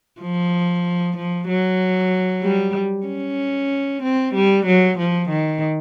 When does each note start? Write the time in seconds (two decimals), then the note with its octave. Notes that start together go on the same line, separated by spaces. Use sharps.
0.20 F3
1.17 F3
1.48 F#3
2.43 G3
3.07 C#4
4.03 C4
4.35 G3
4.66 F#3
4.98 F3
5.29 D#3